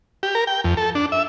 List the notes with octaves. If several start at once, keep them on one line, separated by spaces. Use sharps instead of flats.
G4
A#4
G5
F2
A4
D4
E5